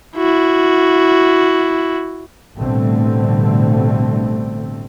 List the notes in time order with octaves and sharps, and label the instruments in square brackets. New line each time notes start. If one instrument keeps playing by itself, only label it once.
[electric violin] E4 F#4
[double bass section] A1 B2 D3 G3 A3 C4